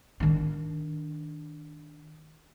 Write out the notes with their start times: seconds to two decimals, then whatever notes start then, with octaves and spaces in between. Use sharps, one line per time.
0.20 D#3 D4